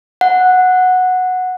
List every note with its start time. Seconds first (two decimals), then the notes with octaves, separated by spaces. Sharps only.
0.21 F#5